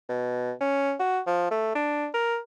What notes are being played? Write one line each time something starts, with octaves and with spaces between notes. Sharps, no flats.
B2
C#4
F#4
F3
A3
D4
A#4